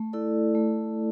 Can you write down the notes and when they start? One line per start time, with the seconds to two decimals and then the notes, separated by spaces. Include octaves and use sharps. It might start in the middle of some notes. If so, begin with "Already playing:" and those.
Already playing: A3
0.13 E4 A4 D5
0.55 A3